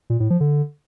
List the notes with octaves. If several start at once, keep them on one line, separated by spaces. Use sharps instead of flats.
A#2
A2
F3
D3